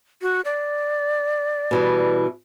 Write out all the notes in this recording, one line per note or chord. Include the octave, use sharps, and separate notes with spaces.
F#4
D5
B2 E3 G3